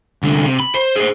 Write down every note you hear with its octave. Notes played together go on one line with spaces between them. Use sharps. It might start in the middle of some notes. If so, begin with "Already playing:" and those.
C2 D3
C3
B5
C5
G#4 C5